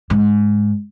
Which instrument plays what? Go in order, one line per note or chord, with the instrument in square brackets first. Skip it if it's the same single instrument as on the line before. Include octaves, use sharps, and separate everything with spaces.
[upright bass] G#2